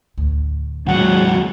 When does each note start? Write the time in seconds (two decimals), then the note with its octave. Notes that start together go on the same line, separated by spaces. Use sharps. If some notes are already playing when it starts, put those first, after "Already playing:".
0.18 D2 A2
0.86 D#2 C#3 F#3 G#3 F#5